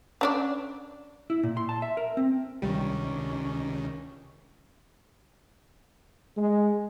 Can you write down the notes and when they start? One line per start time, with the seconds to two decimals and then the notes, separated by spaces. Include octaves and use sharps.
0.21 C#4 D4 D5
1.30 E4
1.43 A#2
1.57 C6
1.69 A5
1.82 E5
1.97 A#4
2.17 C4
2.62 C#2 C3 D#3 G3 C#4 D4
6.37 G#3